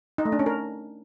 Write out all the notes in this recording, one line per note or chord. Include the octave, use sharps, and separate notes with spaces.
D#4
A3
D4
C#4
A#4